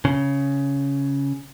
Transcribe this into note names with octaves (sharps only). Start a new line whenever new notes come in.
C#3